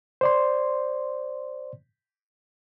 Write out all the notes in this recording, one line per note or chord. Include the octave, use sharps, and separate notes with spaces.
C5 D5 C6